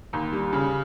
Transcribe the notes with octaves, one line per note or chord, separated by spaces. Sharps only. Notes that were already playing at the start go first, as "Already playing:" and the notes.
D#2
G3
C#3